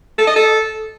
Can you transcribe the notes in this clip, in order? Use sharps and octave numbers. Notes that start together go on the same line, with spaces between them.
A4
D#5
A4